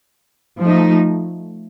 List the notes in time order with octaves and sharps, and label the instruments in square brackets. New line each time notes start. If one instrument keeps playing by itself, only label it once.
[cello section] F3 A3 D#4